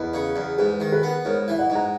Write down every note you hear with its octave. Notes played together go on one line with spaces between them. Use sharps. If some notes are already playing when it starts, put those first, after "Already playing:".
Already playing: E2 B4 D#5
C#3
E2
G#2 G#4 B4
D#3
G#4 B4
B3
G#2 A#4 C#5
E3 E5
D#5 F#5
G#2
F#5 A#5